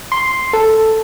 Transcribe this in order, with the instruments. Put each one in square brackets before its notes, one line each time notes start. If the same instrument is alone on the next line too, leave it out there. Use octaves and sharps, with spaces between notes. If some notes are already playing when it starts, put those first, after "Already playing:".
[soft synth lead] C6
A4